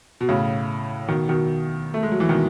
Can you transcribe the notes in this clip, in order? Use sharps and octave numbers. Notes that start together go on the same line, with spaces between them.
B2
A2 C#3
B2 D#3
B2 D#3
A3
G#3
F#3
E3
B2 D#3